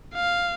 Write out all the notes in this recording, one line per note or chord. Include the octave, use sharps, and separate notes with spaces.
F5